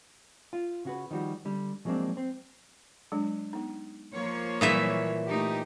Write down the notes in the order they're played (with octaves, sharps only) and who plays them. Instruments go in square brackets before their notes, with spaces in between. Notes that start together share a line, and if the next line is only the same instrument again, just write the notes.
[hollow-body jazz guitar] F4
C#3 F#4 B4
D#3 F3 G3 F#4
D3 G3
F3 F#3 G#3 A#3 C4 D4
C4
[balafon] F#3 G#3 D4
B3 D#4
[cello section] F3 A#3 C#5
[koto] A#2 E3 E5 [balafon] F#3 G3
[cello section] A3 D#4 G4